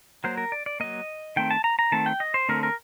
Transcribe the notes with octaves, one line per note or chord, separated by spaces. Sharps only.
F#3 A#3 C5
A#4
D5
D5
F#3 A#3 D#5
D#3 A3 C4 G5
A5
A#5
A#5
D#3 A3 C4 A5
G5
D#5
C5
D3 A3 C4 A#4
A#4